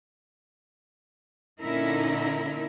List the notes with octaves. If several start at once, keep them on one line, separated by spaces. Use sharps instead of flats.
A#2 D3 C#4 D#4 E4 A#4